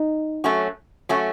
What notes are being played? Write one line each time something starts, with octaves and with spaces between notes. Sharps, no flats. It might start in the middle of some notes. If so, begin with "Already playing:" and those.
Already playing: D#4
F#3 A3 C#4 F#4
F#3 A3 C#4 F#4